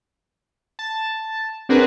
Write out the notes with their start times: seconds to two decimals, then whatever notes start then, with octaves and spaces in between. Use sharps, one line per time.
0.79 A5
1.69 C4 D4 F#4 G#4 A#4 B4